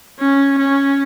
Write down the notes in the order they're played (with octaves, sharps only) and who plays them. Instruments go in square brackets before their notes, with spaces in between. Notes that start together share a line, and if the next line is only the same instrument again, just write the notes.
[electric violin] C#4
C#4